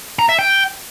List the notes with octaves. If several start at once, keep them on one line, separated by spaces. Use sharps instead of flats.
A#5
E5
G5